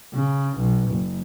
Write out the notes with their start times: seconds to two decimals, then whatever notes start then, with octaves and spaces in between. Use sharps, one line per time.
0.14 C#3
0.57 B1
0.91 F#1